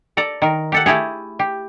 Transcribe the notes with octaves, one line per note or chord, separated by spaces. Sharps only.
A4 D5 A#5
D#3 A#4
G4 A4 F#5
A3 E4 G4 G#4
G4